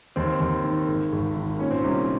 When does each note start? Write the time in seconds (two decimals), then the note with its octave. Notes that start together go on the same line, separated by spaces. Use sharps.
0.16 D#2 C4
0.40 D#2
0.64 D#3
0.88 G#1
1.13 G#1
1.36 D#3
1.59 A#2 C#4
1.71 C4
1.81 C2 C#4